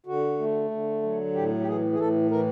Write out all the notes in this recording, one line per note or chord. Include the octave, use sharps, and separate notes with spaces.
D3 F#4
A3
D3
F#3
A2 G4
G4
E3 G#4
G#4
A2 A4
E3 A#4